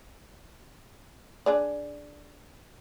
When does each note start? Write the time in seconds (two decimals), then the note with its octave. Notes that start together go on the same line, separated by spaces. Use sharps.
1.46 D4 G#4 D5